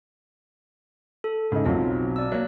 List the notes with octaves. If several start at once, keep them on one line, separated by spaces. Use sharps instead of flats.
A4
G#2 C#3 D#4
B1 B2 F#3 C4 F4
D5 E6
F#3 A#3 C#5 F#6